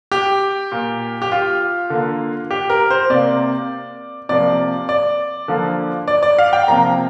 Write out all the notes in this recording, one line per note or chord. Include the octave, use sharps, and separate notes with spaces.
G4
A#2 A#3
G4
F4
D3 A#3
G4
A#4
C5
C3 A#3 D5
C3 F3 A#3 D5
D5
D3 F3 A#3
D5
D5
F5
G5
C3 F3 A#3 A#5